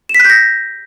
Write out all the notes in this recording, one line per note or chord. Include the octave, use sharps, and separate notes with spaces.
E7
B6
F#6
G6
A#6